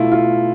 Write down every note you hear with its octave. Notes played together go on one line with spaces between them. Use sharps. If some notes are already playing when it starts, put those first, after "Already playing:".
Already playing: B2 A3 E4 F4
F4